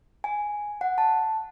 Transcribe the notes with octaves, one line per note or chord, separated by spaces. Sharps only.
G#5
F#5
A5